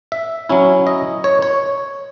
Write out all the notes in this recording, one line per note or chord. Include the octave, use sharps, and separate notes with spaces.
E5
F#3 C#4 E4
D#5
C#5
C#5